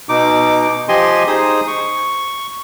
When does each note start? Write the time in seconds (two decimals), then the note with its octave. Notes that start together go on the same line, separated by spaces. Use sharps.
0.09 B2 D#4 D6
0.89 F3 G4 D#5 G#5 C6
1.27 D#4 G#4 C5 D#6
1.67 C#6